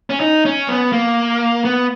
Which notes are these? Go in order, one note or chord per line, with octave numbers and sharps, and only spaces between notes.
C#4
D#4
C#4
B3
A#3
B3